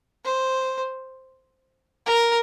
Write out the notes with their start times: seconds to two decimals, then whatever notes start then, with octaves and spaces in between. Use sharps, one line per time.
0.24 C5
2.06 A#4